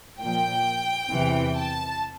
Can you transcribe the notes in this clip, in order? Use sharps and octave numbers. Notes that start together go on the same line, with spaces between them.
A#2 F3 A#3 G5
E2 C3 E3
A5